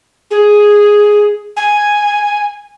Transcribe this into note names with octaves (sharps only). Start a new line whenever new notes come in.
G#4
G#5